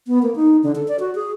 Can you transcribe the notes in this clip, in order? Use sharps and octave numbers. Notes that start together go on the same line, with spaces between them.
B3
A#3
D#4
D3
A4
D5
F#4
G#4